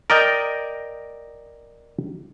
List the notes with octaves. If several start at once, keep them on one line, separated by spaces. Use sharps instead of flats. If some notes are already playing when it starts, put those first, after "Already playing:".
A#4 D5 D#5 G5